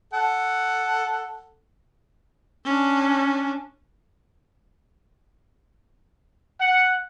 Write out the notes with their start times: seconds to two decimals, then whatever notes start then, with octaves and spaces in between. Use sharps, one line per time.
0.13 A4 F#5
2.65 C#4 D4
6.60 F#5